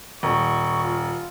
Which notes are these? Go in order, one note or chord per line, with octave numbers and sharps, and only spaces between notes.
D#1 C#6
F4